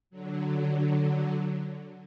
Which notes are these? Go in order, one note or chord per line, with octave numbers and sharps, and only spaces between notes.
D3 F#3